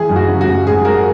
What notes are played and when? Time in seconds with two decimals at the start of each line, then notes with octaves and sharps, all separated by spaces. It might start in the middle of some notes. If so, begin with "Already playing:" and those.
Already playing: E3 G#4
0.09 F#2
0.16 F#4
0.28 C#3
0.41 F#4
0.48 F#2
0.66 G#1 G#4
0.85 G#3 F#4 A#4